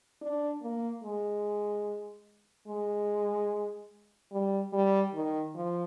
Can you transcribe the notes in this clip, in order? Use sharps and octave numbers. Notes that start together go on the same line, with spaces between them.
D4
A#3
G#3
G#3
G3
G3
D#3
F3